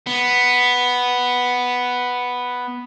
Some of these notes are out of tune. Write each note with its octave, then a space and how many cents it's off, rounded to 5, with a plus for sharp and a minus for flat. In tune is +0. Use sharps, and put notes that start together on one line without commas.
B3 +0